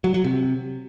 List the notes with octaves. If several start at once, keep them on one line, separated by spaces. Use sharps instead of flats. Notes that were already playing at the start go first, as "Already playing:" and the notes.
F#3
F#3
C3